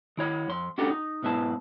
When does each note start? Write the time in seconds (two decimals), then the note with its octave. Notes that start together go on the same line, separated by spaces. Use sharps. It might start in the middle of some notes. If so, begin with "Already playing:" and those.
0.17 D#3 E4 C#5
0.48 F2 C6
0.78 C#4 D4 F#4 G4 A4
0.90 D#4
1.23 B1 G#2 B3 E4 A5